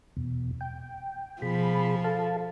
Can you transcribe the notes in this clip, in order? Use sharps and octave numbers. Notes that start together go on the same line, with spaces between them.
E2 B2
G5
B2 F3 G#4 B5
A4 F5 A5